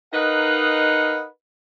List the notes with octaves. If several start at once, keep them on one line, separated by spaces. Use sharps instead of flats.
D#4 A#4 B4 D#5 F5 F#5